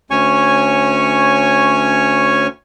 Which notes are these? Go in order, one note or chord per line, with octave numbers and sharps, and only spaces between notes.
D2 C#4 C#5 G#5 C#6